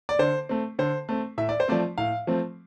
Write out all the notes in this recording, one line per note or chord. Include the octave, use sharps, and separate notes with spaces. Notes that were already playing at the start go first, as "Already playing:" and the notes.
D5
D3 C5
A3 C4
D3 C5
A3 C4
A2 E5
D5
C5
F3 A3 C4 D5
A2 F5
F3 A3 C4